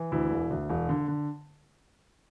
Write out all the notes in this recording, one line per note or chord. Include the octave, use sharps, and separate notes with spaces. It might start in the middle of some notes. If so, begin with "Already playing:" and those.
Already playing: E3
D2 E4
E1
D2
E1
D3
D3